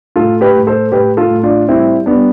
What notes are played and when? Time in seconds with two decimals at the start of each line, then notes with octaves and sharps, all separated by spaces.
0.16 A2 F4 A4
0.41 G4 B4
0.55 A2
0.67 A4 C5
0.92 A2 G4 B4
1.17 F4 A4
1.30 A2
1.43 D4 F4
1.68 G3 C4 E4
2.06 G3 B3 D4